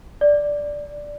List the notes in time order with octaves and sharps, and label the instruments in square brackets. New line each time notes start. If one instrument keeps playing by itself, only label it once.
[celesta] D5